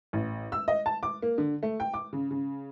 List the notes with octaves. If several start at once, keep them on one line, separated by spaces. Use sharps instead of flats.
A1
E6
D#5
A5
D6
A#3
D3
A3
G5
D6
C#3
C#3